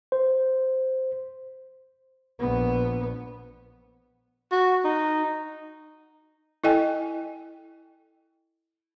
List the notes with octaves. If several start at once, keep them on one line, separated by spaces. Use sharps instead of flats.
C5
A#1 B3
F#4
D#4
E4 A4 D#5 G5 G#5